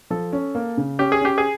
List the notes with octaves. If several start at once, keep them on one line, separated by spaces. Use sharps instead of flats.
F3 A4
C#4
A#3
C#3
C#4 G4
G#4
C#4 G4
G#4